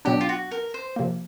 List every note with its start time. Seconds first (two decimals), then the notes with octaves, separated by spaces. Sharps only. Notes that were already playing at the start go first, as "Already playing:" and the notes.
0.05 B2 F#3 B3 D4 G4
0.21 F4
0.29 F#4
0.51 A#4
0.74 C5
0.96 C3 F3 A#3